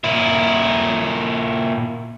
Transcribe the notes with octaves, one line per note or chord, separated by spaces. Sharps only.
A#2 E4